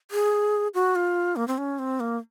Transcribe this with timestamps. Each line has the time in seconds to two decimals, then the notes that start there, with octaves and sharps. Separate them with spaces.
0.11 G#4
0.74 F#4
0.95 F4
1.36 A#3
1.48 C4
1.58 C#4
1.79 C4
2.00 A#3